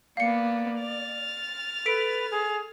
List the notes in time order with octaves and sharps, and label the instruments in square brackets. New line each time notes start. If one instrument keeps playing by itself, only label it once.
[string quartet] A#3 B3 [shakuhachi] D5 [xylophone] F5 C#7
[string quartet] F6 A6
[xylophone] A4 B6 D7 [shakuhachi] B4
[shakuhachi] G#4